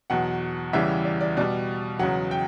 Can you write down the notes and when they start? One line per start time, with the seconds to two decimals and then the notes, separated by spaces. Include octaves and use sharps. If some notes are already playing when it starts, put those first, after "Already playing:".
0.10 E2 B2 F#3 F#5
0.73 E2 C#3 E3 G3 E5
1.05 D5
1.21 D5
1.37 B2 G3 D5
1.99 E2 C#3 F#3 F#5
2.31 G5